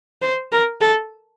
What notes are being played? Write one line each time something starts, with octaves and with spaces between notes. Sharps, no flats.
C5
A#4
A4